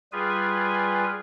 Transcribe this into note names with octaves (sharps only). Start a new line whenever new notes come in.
G3 F4 G#4 B4 G#5